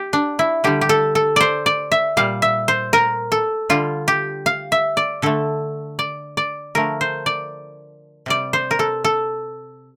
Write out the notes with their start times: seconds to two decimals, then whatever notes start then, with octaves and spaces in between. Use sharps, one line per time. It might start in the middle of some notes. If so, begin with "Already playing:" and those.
Already playing: G4
0.13 D4
0.39 E4
0.64 D3 G3 G4
0.81 G4
0.89 A4
1.15 A4
1.36 C5 D5
1.66 D5
1.92 E5
2.17 A#2 G3 F5
2.42 E5
2.68 C5
2.93 A#4
3.32 A4
3.69 D3 G3 F4
4.08 G4
4.46 F5
4.72 E5
4.97 D5
5.22 D3 A3 A4
5.99 D5
6.37 D5
6.75 D3 F3 A3 A#4
7.01 C5
7.26 D5
8.26 C3 G3 D5
8.53 C5
8.71 A#4
8.79 A4
9.04 A4